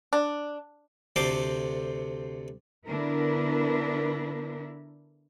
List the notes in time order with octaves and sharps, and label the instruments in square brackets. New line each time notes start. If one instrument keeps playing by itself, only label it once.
[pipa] D4
[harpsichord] D2 C3 A3 C5 C6 D6
[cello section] D3 B3 D4 E4 A#4 B4